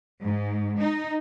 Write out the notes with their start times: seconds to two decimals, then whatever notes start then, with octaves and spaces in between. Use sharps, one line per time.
0.22 G#2
0.79 D#4